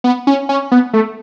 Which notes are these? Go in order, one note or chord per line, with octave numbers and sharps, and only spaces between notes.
B3
C#4
C#4
B3
A3